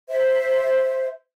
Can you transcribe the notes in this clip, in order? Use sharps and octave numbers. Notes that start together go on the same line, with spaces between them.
C5 E5